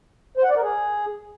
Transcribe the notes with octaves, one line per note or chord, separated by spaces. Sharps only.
C5
F#5
D5
A#4
G#4